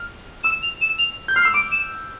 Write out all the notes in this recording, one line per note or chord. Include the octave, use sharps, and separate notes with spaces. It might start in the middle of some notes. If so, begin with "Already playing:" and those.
Already playing: F6
E6 E7
F7
E7
F7
G6
F6 C7
E6
D6 D7
E7